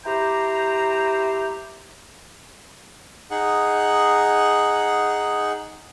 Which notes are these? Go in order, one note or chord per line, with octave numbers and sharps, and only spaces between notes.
E4 G4 C5 G5 A#5
D#4 G#4 F#5